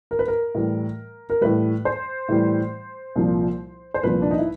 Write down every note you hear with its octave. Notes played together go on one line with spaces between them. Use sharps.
A#4
B4
A#4
A2 E3 G3
A#4
A2 E3 G3 B4
C5
A2 E3 G3
C2 A#2 F3
C5
C2 A#2 F3 B4
D4
D#4
E4